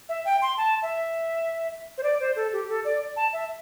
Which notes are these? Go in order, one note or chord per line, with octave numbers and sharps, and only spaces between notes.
E5
G5
C6
A5
E5
C5
D5
C5
A4
G4
A4
D5
A5
E5